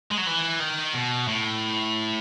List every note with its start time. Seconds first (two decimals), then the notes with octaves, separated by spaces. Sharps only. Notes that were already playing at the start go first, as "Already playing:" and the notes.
0.11 G#3
0.18 F#3
0.26 E3
0.60 D#3
0.94 B2
1.28 A2